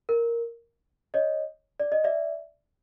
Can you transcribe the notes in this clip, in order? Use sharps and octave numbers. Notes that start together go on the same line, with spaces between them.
A#4
C#5 D#5
D5
D#5
D5 E5